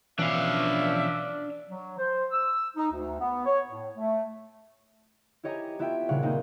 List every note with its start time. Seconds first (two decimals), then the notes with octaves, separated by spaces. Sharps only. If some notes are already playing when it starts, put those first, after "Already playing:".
0.19 B2 E3 F3 C#4 D4 E5 F5
1.69 F#3
1.98 C5
2.31 E6
2.76 D#4
2.91 D2
3.19 B3
3.46 C#5
3.68 A2
3.96 A3
5.43 E4 G4 C#5 D#5 G#5 A#5
5.79 B3 E4 F4 E5 G5
6.09 D#1 C#3 F5 F#5 C#6
6.23 A#3 C4 D#4